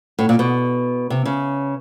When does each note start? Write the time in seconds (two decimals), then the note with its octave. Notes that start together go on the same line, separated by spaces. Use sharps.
0.19 A2
0.29 A#2
0.39 B2
1.10 C3
1.25 C#3